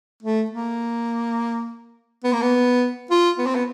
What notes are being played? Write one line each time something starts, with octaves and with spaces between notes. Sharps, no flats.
A3
A#3
B3
A#3
B3
F4
B3
C4
B3